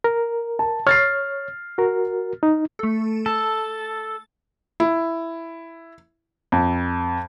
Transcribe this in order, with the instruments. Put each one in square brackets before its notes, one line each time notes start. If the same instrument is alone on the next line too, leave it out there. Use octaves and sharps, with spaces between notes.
[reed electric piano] A#4
[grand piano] A5
[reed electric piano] C#5 [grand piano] F6 A6 C7
[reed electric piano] F#4 A#4
D#4
[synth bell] A3 A4
[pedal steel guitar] A4 [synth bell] A5
[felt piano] E4
F2